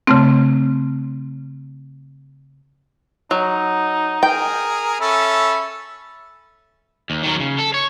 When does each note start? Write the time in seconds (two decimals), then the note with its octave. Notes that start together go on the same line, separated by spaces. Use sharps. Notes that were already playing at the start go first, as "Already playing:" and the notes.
0.07 C#3 A3 C4
3.31 F#3 D#4
4.23 G#4 A#4 G5
5.01 C#4 A4 E5 B5
7.10 D#2
7.23 D#3 F#3
7.40 C#3
7.59 A4
7.74 C#5